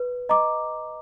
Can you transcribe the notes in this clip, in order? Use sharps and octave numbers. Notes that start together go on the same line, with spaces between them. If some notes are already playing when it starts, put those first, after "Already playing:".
Already playing: B4
D#5 A#5 D6